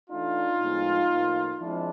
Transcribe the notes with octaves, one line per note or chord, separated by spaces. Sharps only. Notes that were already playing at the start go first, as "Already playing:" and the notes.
E3 A3 D4 D#4 F4
A2 F3 G#3 B3
A2 F3 A#3
F3 G#3 C4 D4 E4